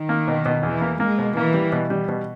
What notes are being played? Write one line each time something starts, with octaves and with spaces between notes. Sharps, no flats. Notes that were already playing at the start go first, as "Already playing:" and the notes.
Already playing: D#3
A#3
B2
B2
E2 E3
A#3
G#3 A#3
B2
E3 A#3
G3
B2
G3
B2